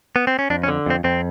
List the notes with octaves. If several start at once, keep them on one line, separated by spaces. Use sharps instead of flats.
B3
C4
C#4
F2 D4
C#4
D3
F2 C4
F2 C4